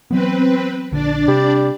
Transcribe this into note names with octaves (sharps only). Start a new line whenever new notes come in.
E3 F#3 B3 C4 B4
A#1 D3 D4 D5
C3 G3